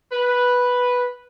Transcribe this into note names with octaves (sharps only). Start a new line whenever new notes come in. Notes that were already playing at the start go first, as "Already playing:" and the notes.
B4